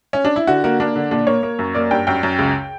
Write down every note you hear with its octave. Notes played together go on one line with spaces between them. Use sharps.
C#4
D4
E4
D3 F#4
A#3 F#4
A#3 D4
D3
A#2 D4
A#3 C#5
A#3
F#2
A#3 D5
G2 G5
F#2 G5
F#2
C#2